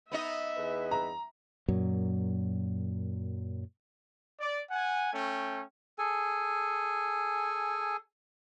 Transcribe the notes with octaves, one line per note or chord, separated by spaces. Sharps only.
B3 D#4 D#5 E5
E2 G#4 B4
A#5
F#2 A#2 F#3
D5
F#5 G#5
A3 C#4 G5
G#4 A4 G#5